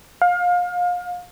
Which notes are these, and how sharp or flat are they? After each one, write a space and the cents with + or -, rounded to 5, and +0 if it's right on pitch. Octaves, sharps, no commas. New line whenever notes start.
F5 +30